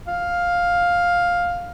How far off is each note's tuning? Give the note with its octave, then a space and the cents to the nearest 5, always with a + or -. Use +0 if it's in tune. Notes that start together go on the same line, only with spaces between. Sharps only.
F5 +10